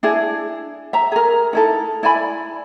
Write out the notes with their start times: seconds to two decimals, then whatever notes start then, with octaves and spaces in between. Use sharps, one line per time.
0.03 D4 E4 G#4
0.93 E5 A#5
1.12 G#4 A#4
1.53 D#4 E4 A4
2.03 E4 D5 G#5 B5